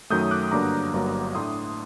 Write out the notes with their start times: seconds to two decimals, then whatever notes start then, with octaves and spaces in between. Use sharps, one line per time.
0.10 F#2 D#3 F#3 A3 D#6 G6
0.31 D6 F#6
0.52 G2 D3 F#3 A#3 D4 A#5 D6
0.93 G1 G2 F#3 A#3
1.35 A2 A3 D4 C6 D#6